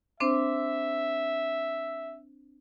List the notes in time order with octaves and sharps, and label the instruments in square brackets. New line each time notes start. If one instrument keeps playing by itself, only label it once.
[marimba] C4 D4 C5 [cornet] E5